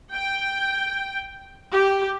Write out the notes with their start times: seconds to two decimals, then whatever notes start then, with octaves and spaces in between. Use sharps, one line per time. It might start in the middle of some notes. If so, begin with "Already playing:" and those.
0.12 G5
1.72 G4